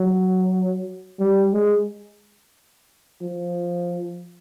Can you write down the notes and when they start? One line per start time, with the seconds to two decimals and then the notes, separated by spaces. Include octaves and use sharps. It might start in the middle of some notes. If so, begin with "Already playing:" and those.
Already playing: F#3
1.19 G3
1.53 G#3
3.22 F3